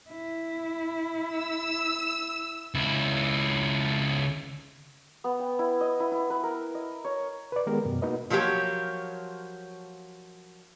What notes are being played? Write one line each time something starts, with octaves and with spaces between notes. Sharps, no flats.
E4
E6
C#2 E4
B3
G5
E4
D#5
E4
E4
B4
A#4
D#5
C#5
B4 D5
D#3 G#3 B3 G4 A#4
F#2 B2
A#3 D#4 F#4 B4 D#5
F3 F#3 A#3 G4 C#5